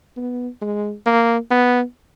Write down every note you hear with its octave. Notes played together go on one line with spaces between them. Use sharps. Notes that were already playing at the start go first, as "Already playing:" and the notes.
B3
G#3
A#3
B3